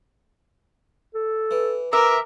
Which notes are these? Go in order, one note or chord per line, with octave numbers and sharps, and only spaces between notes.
A4
E3
E3 A#4 E5 D6